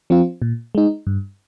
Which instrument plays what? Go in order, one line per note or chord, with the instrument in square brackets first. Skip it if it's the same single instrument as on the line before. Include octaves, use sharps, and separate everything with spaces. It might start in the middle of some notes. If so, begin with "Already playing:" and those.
[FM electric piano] F3 C4 F4
A#2
G#3 D#4
G2